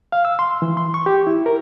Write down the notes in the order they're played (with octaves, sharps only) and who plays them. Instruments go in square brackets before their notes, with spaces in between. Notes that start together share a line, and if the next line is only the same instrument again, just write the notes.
[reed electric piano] F5
E6
C6
E3
C6
C#6
G4
E4
A#4